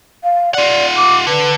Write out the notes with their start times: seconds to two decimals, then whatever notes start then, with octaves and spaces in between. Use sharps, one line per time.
0.23 F5
0.54 F4 D5 F#5
0.96 D6
1.27 D3 B4